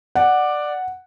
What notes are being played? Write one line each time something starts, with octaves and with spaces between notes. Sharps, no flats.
D5 F#5